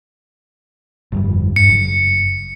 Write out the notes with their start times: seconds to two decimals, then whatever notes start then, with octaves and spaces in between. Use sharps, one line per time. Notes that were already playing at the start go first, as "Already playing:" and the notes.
1.12 G1 F2 G3
1.56 G2 C#7
1.69 F#1